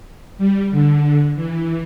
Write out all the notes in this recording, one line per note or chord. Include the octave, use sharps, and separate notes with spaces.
G3
D3
E3